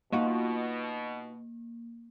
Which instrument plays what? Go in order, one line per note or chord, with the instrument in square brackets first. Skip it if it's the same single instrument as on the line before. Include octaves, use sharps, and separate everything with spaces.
[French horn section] B2 [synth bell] A#3 [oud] D#4 F4 F#4